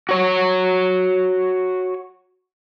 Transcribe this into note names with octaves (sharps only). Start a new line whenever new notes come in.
F#4 C#5